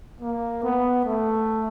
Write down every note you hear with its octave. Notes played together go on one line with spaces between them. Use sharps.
A#3
B3
A3